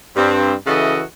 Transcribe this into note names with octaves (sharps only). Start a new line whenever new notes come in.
G2 C4
C#3 E3 F#4 A4 D#5 E5